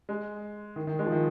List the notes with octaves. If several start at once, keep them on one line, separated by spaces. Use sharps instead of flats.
G#3
D#3
D#3
G#3
F3
D#3